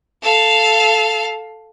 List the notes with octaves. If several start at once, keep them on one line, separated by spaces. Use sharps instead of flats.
A4 F5